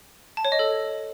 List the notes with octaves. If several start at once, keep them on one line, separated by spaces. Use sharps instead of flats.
A5
C#5
D#5
A4